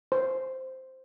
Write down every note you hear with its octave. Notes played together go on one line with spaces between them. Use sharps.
C5